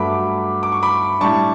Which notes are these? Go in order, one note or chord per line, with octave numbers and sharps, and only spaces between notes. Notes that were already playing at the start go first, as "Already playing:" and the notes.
Already playing: G2 F#3 A3 B5 D6
D6
C#6
B5 D6
A2 G3 D4 A5 C#6